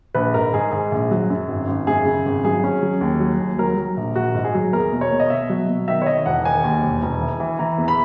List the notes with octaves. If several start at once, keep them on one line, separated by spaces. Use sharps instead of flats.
A#1 B4
G#2 A#4
G#2 G#4
G#2 G#4
A#1
F#3
F#2
G#1
G#1
F#2 G#4
C#3
G#1
F#3 G#4
C#4
F#3
D#2
F#3
D#2
F#3 A#4
F#3
A#1
A#1 F#4
G#2
G#4
F#3
E2 A#4
B2
C#5
B2
D#5
B2 E5
F#3
B2
D#3 E5
C#5
D#3 D#5
E1 F#5
D#3 G#5
D#2
E1
E1
E3
E3
E3 A#5
E2
B5